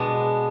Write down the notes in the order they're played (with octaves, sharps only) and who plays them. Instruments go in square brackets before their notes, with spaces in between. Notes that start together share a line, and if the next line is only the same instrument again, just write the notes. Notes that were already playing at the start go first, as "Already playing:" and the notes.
Already playing: [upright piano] B2 [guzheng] G#3 B3 D4